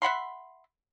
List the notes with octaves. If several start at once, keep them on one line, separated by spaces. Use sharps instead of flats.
E5 F#5 B5 C6